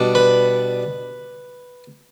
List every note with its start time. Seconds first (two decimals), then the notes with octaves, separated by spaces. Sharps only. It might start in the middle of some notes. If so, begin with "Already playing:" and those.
Already playing: B2 G3 D4
0.15 B4 B5